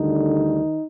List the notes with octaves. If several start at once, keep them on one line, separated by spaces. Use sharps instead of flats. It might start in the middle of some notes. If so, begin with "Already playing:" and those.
Already playing: D2 D3 D#3 G3 D#4